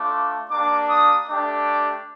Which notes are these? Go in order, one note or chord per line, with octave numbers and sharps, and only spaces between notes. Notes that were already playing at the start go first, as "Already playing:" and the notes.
Already playing: A3 D4 F4 D6
A#3 D4 G4 D6
D#6
A3 D4 G4 D6